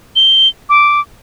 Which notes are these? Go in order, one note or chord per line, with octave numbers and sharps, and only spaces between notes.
G7
D6